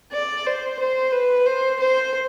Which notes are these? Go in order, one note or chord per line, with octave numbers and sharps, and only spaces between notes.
D5
C5
C5
B4
C5
C5